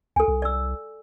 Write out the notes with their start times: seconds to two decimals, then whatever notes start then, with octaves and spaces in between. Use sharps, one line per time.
0.16 C#2 A4 G#5
0.28 C2
0.42 D5 E6